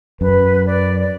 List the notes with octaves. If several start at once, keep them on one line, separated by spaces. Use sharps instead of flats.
F#2 B4
D5
D5